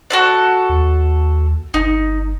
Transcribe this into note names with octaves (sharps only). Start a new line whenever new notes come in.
F#4 A4 D5
D#2
G1 D#4